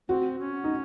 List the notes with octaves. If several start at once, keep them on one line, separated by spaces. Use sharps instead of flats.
C4 F#4
C#4
D#4